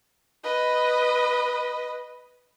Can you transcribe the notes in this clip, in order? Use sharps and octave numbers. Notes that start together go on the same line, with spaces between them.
B4 D#5